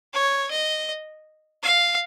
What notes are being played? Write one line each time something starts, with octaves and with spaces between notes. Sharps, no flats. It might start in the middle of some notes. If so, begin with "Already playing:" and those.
C#5
D#5
F5